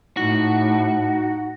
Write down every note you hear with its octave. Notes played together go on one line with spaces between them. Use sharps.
A2 D#4 F#4